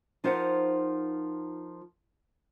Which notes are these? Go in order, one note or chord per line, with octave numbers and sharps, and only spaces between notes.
F3 D#4 F4 A#4 C5 F#5